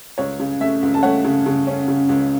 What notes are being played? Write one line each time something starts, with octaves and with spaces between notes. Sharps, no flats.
C#2 C#5
C#3
A3 E5
C#2
A5
A3 C#5 F#5
C#3
C#3
C#4
C#3
C#2